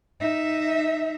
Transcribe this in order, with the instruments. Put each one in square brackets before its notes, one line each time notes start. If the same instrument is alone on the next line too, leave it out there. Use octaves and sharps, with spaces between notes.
[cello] D#4 E5